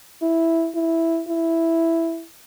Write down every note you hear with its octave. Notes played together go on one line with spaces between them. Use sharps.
E4
E4
E4